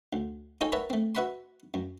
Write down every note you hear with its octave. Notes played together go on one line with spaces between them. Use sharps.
D2
D#4 F4 A4 C#5 G5 G#5
A#4 B4 C#5 E5 F#5 A5
A3 C4
F#4 B4 E5 F#5 B5 C6
F#2